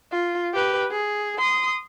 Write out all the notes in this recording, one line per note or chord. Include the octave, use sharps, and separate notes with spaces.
F4
G4 B4
G#4
C6 D#6